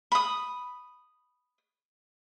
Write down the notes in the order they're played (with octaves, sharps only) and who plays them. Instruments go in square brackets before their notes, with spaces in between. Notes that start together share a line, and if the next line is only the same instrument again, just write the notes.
[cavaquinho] B5 D#6